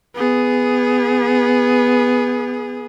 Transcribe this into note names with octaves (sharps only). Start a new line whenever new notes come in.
B3 G#4